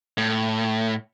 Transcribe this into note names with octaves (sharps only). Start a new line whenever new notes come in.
A2